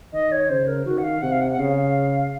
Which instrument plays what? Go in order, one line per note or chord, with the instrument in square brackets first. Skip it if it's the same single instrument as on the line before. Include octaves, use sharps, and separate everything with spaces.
[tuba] D#3 [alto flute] D#5
[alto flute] C#5
[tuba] C#3 [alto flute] C5
[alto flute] A#4
[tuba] D#3 [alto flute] F#4
[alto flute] F#5
F5
[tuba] C3 [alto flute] F#5
[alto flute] F5
F#5
F#5
[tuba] C#3 [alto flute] F5